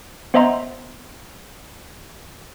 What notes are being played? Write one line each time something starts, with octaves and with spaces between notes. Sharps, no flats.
B3 C5 D#5 E5 A#5 C6